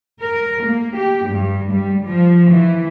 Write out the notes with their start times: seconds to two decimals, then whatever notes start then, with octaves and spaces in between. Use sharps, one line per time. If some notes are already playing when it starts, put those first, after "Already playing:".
0.21 A#4
0.65 A#3
0.97 G4
1.27 G2
1.73 G3
2.05 F3
2.53 E3